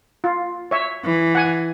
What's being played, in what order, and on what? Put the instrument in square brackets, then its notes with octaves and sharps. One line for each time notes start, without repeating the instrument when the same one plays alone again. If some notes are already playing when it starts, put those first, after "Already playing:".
[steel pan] F4
C#5 E5
[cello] E3
[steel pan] F#5 G#5